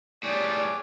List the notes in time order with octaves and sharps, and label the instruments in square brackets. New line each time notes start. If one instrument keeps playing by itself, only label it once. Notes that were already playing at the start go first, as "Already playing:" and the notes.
[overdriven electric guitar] A2 G3 [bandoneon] G#4 C#5 D6 [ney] D5